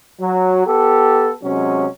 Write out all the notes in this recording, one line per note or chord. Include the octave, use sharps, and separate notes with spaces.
F#3
B3 G4 A4
C3 F#3 G#3 C#4